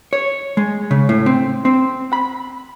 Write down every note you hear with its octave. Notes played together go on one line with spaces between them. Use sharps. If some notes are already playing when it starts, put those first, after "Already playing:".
C#5
G#3
C#3
A2
C4
C4
B5